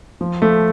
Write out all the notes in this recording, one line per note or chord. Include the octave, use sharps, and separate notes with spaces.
F3
F3 A3